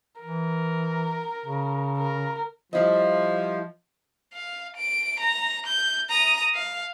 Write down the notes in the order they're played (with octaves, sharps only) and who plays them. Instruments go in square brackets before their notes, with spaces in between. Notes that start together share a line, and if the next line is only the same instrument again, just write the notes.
[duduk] E3 [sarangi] A#4
[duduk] C#3
[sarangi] A#4
[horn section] F3 [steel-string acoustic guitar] G3 E4 D#5
[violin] F5
D7
A#5
G6
A#5 D#6
F5